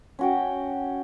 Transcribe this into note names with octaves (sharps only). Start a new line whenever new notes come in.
C#4 F#4 G5